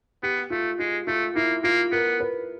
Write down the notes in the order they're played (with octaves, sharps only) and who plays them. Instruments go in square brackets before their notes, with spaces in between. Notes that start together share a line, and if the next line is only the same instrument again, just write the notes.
[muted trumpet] B3 [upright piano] G4
[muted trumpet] A3 [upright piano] F4
[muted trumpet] G#3 [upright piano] F4
[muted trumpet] A3 [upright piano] F4
[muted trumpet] A#3 [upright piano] E4
[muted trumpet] A#3 [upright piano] F4
[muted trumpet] B3 [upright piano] A#4
[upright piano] B4